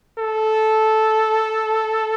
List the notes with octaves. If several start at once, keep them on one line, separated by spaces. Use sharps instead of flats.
A4